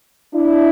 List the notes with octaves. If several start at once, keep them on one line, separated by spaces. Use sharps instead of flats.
D4 E4